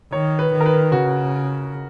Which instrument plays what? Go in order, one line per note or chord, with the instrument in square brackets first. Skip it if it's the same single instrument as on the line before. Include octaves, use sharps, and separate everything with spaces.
[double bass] D#3 [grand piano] C#5
[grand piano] B4
[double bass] D#3
[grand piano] A#4
B4
[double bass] C#3 [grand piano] F#4